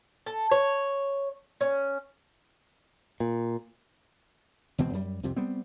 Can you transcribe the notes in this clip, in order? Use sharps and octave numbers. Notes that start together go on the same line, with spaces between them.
A4
C#5
C#4
A#2
C#2 B2 E3 C4
F#2 G3
C2 F2 C3
G3 B3 C4